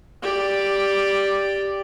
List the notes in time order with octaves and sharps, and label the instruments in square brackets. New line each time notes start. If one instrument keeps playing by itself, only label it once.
[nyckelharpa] G4 D5